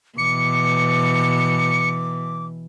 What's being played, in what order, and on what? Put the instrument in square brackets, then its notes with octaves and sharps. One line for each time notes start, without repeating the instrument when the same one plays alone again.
[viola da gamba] B2 E3 [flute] D6 [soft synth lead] C#7